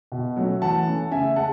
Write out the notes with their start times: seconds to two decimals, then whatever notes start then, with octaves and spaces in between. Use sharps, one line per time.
0.12 B2
0.36 F#3 A3 C#4
0.62 E3 F#5 A5
0.86 A3 C#4
1.11 C#3 E5 G#5
1.36 G#3 F#5 A5